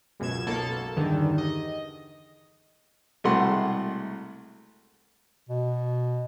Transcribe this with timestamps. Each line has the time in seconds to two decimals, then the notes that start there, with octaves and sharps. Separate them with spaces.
0.20 C#2 F#2 B2 G#6 E7
0.47 B1 B2 A#3 A4 A5
0.96 E2 G2 D3 D#3
1.38 D#5
3.24 C2 B2 G#3 A3 F#5 C6
5.49 B2